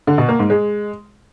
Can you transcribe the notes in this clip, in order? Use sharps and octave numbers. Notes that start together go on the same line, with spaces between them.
D3
B2
A#3
G#2
G#3